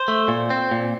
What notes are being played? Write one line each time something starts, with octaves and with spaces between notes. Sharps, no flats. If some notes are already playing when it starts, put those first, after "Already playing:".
Already playing: C5
A3
A#2
C4
A#2